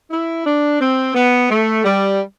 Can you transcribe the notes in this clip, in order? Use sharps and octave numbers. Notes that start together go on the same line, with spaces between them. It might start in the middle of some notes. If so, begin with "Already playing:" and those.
E4
D4
C4
B3
A3
G3